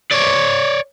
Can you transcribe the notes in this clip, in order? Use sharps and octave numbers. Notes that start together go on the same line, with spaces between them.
C#5 D5